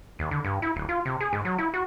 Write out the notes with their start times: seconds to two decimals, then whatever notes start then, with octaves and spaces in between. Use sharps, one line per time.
0.19 D#2
0.31 D3
0.44 G2
0.62 E4
0.76 D1
0.89 F4
1.05 C3
1.20 G#4
1.33 G#2
1.45 F#3
1.58 E4
1.74 F#4